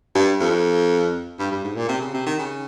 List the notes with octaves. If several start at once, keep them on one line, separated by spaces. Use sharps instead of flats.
G2
F2
G2
G2
G#2
A#2
C3
C#3
C3
D#3
C#3